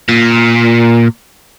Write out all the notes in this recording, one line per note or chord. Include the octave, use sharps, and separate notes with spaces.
A#2